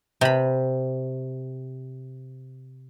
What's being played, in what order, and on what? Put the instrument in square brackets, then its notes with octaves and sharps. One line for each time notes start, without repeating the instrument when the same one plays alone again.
[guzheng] C3 B5